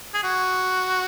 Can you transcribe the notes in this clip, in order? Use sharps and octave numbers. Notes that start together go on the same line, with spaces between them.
G#4
F#4